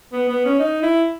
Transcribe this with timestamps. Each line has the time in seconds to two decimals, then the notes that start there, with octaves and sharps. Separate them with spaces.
0.13 B3
0.29 B3
0.45 C#4
0.60 D#4
0.83 E4